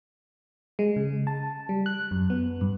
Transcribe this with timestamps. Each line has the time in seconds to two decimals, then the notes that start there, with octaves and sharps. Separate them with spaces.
0.79 G#3
0.96 C#3
1.27 A5
1.69 G3
1.86 F#6
2.11 F#2
2.30 B3
2.61 G2